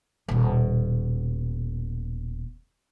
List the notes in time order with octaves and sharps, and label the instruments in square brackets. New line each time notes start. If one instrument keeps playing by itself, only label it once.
[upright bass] D#1 B2